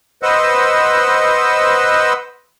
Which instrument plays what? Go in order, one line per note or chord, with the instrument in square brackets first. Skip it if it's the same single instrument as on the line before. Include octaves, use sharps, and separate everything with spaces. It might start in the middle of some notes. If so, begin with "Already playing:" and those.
[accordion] B4 C5 D#5 F#5 E6